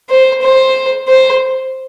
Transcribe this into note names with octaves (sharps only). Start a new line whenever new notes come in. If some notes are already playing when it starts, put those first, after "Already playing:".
C5
C5
C5